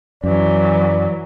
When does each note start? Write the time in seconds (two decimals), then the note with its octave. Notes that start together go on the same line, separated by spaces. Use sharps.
0.24 F#2 E3 F#3 D5